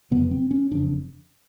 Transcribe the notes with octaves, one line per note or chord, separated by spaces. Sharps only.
F#1 F2 C3 B3
C4
C#4
F#1 F2 C#3 D4